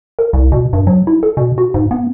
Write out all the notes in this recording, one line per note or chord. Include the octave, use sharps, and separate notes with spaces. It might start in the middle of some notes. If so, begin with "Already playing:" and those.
A#4
C2
B2
G2
F#3
E4
A4
B2
F#4
G#2
B3